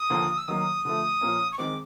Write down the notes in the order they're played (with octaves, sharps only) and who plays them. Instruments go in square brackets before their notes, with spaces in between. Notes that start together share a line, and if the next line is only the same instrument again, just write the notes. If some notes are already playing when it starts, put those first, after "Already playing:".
Already playing: [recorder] D#6
[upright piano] D#2 D3 F3 A#3
[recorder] E6
[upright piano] D#3 F#3 A#3 [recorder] D#6
[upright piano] D3 F3 A3
A#2 F3 A#3 C#4
[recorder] C#6
[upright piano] D#3 G#3 C4 [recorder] D6